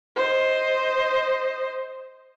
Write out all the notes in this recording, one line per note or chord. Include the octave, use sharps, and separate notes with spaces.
C5 D#5